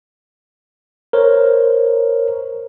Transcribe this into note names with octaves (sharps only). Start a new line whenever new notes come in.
A#4 C5 C#5